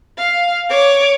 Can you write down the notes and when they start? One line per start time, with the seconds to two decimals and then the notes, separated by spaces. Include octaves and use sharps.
0.18 F5
0.70 C#5 D6